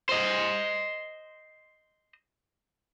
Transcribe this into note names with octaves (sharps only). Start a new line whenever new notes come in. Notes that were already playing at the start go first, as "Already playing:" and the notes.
C5 D#5